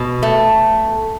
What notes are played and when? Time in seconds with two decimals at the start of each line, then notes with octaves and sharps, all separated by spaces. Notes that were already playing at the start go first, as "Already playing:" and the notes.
Already playing: B2
0.23 A3